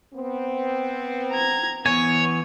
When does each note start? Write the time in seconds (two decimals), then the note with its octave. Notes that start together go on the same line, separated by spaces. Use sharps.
0.14 B3 C4
1.32 A#5 G#6
1.86 E3 B3 C#5 G#5